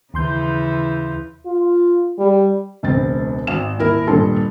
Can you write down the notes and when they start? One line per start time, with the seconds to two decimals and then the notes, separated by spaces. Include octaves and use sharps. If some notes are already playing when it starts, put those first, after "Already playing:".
0.14 D#2 C#3 E3 C6 G6
1.46 F4
2.18 G3
2.83 E1 C#2 C4 A6
3.47 G#1 F5 E7
3.79 D#1 E4 A#4
4.07 D#1 G2 A#2 G3 A4 C6